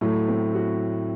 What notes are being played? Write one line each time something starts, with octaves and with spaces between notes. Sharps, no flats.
A2 F#3 A3
C4
F#4